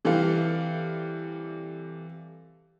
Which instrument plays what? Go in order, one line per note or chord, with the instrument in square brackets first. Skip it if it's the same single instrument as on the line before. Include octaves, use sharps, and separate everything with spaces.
[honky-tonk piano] C3 E3 G3 A4 F5